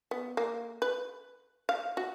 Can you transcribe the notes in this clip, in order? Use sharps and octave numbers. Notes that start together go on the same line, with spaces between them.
B3
A#3
B4
F5
F#4